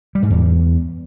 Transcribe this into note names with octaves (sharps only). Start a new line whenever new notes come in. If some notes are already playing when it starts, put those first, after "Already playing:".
G3
G#2
E2